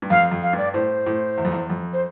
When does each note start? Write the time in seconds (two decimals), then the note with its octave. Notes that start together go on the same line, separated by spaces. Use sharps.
0.02 G2
0.10 F2 F5
0.31 F2
0.42 F5
0.53 G2 D5
0.74 A2 C5
1.06 A2
1.38 E2
1.45 F2
1.52 E2
1.70 F2
1.93 C5